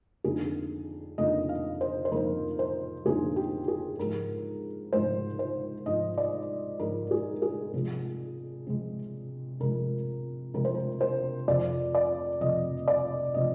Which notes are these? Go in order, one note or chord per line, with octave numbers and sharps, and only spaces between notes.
F2 D3 F3 A#3 D#4 G#4
F2 D3 F3 A#3 D#4 D#5
F5
C5
C5
F2 D3 F3 A#3 D#4 A#4
C5
F2 D3 F3 A#3 D#4 G#4
G4
G#4
G#2 F3 G#3 A#4
G#2 F3 G#3 C5
C5
G#2 F3 G#3 D#5
D5
G#2 F3 G#3 A#4
G#4
G#4
C3 F3 G#3
C3 F3 G#3
C3 F3 G#3 A#4
C3 F3 G#3 A#4
C5
A#4
C5
F2 C3 F3 C4 D5
D5
F2 C3 F3 C4 D#5
D5
C3 F3 C4 D#5